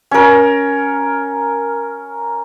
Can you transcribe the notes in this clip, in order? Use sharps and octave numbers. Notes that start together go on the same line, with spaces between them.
C#4 A#4